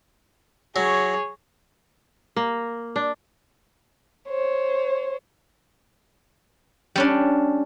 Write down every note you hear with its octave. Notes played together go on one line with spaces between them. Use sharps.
F#3 G#4 C#5
A#3
D4
C5 C#5
G3 C#4 D4